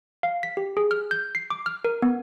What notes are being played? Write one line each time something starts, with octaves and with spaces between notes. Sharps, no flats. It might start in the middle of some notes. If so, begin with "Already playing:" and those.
F5
B6
G4
G#4
F6
G6
C7
D6
F6
A#4
B3